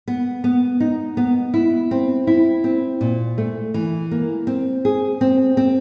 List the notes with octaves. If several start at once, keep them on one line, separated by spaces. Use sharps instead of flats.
B3
B3
D#4
B3
E4
C4
E4
C4
A#2
A3
E3
A#3
C4
G#4
C4
C4